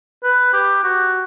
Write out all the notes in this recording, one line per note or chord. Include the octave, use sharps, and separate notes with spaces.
B4
G4
F#4